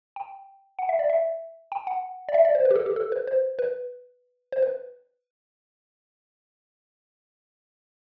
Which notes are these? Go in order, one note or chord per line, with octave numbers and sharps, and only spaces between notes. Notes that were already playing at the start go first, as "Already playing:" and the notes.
G5
F#5
E5
D5
E5
G5
F#5
D5
E5
D5
C5
B4
G4
A4
G4
A4
B4
C5
B4
C5
B4